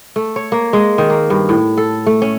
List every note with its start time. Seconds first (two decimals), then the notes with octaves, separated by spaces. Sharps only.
0.16 A3
0.36 C#5
0.52 A#3
0.73 G#3
0.98 D#3
1.10 A#3
1.30 G2
1.49 A2
1.78 A4
2.06 A3
2.22 C#4